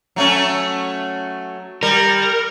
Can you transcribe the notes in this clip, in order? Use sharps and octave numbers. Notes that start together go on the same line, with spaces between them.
F#3 A3 C#4
G3 A#4